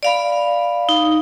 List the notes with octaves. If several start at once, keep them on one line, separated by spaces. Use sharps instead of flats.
D5 F5 B5
D#4